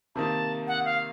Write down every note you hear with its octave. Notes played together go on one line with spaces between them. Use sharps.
C3 D#3 A#3 A5
F#5
F5